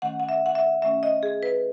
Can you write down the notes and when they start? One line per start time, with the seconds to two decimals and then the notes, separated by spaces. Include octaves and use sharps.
0.02 D#3 A3 C#4 F#5
0.20 F#5
0.29 E5
0.46 F#5
0.55 E5
0.82 D#3 A3 C#4 E5
1.03 D#5
1.23 G#4
1.43 B4